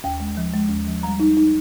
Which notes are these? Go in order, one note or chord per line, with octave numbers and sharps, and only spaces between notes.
D#2 G5
G#3
F3
G#3
D#2
F3
G3 A#5
D#4
D#4